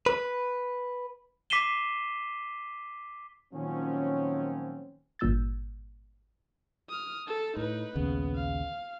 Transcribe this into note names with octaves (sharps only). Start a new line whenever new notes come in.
B4
D6 B6 C7 D#7 E7 G7
A#2 D#3 F3 F#3 C4 C#4
G#1 G2 A#2 E6 G6 A6
D#6 F6
A4 A5
A2 D#4 B4
A#1 D#2 C#3 B3
F5